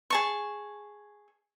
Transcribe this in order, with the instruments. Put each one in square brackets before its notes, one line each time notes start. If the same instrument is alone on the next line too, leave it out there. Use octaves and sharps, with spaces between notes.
[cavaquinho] G#4 A5 C#6